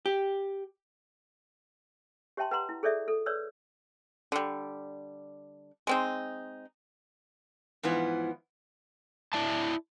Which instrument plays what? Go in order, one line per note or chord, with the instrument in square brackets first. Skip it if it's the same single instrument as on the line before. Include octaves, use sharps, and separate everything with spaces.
[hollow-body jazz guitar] G4
[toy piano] G4 C#5 E5 G5 A5 C6
B4 F#5 A#5 C6
E4
G#4 A4 C#5 D5 E5
A4
B4 C#5 D5 E6
[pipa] D3 G3
G#3 C4 D#4
[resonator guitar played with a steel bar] G#2 E3 F3 B3 E4
[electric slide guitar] E4 D5 E5 A5